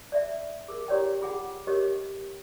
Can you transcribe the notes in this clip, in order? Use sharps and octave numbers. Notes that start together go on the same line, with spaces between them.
D5 E5
G#4 A#4
E4 G4 A#4 C#5 D5 G5
F4 G#4 F#5 G5
G4 G#4 A#4 C#5 D#5 E6